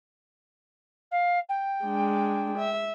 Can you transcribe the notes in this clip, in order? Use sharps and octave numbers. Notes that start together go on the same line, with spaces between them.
F5
G5
G#3 D4
E5